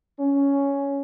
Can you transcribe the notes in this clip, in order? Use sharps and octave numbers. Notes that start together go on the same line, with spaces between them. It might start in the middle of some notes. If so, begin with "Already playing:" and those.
C#4